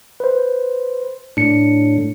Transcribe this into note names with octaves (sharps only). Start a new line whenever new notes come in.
B4 C5
A2 D4 C#7